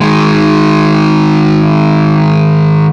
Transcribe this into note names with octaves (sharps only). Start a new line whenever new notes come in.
D#3 G#3